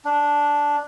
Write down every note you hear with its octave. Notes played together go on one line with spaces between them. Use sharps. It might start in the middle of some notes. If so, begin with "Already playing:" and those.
D4